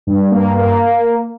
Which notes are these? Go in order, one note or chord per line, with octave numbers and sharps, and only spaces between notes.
G2
A#3
A#3